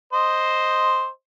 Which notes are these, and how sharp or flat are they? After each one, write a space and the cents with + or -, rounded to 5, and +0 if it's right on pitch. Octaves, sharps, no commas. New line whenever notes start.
C5 +0 D#5 +0